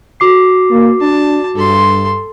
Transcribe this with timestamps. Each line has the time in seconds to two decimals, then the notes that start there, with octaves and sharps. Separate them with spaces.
0.20 F#4 D6 C7
0.70 A#3
1.01 D4 A5
1.56 G2 A4 C6